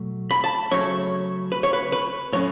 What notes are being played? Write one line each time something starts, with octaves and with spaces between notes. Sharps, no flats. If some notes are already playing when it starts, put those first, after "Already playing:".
Already playing: B2 F#3 A3
B5
A5
C#3 F#3 A3 C#4 C#5
B4
C#5
B4
B4
A2 F#3 C#4 C#5